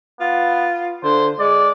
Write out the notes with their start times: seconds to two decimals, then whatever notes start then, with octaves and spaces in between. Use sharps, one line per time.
0.21 B3 F4
1.04 D3 C5
1.40 G#3 D5